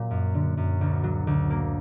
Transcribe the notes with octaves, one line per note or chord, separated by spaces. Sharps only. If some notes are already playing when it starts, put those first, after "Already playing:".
Already playing: A#2 F#3
F#2
D3
F#2
D2
F#3
D2
A#3